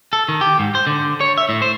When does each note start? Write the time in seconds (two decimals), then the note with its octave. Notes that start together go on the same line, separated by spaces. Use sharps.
0.13 A4
0.29 D#3
0.41 G4
0.59 G#2
0.75 C5
0.87 D3
1.21 C#5
1.38 E5
1.49 A2
1.62 C5